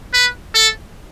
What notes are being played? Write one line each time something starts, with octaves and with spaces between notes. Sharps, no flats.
B4
A4